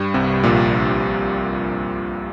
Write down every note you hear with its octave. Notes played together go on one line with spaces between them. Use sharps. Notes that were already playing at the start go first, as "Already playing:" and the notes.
Already playing: G2 G3
C2 C3
A#1 A#2